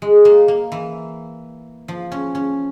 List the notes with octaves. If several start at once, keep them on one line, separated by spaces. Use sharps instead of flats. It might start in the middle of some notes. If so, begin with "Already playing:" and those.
G#3
A#3
A#3
E3
F3
C#4
C#4